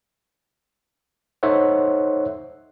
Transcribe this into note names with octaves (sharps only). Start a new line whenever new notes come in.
D#4 A4 C5 C#5 E5 F#5